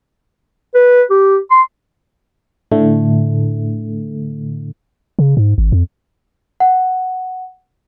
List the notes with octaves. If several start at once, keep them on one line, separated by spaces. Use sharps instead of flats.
B4
G4
C6
A2 D3 A3
C#3
G#2
G#1
F2
F#5